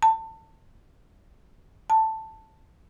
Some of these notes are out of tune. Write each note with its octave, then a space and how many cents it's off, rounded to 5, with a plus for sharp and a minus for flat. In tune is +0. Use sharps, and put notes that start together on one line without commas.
A5 +25
A5 +5